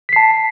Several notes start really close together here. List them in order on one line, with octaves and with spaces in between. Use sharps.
B6 C7 A5